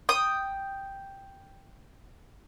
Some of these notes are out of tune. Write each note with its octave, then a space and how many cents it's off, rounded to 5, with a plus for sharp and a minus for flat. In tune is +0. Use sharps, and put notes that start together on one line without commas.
G5 +0 D#6 +0